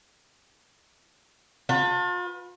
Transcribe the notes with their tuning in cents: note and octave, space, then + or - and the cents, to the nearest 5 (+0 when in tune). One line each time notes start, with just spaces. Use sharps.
F4 +40 B4 +0 A5 +30